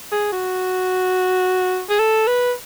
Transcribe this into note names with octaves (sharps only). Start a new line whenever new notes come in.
G#4
F#4
G#4
A4
B4